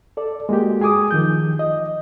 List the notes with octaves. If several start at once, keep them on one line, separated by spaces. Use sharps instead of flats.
A4 D5
G#3 A#3 F#4 G4
G#4 G#5 D6 D#6
D#3 F3 G6
D#5